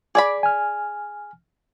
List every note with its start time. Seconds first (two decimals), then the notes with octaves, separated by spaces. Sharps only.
0.15 G#4 D5 B5 D6
0.43 G#5 F6